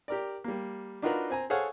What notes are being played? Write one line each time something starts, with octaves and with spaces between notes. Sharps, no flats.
G4 A#4 D5
G3 A#3
D4 D#4 F4 F#4 A#4 B4
C4 G#5 A#5
G#4 A4 C5 C#5 F5 F#5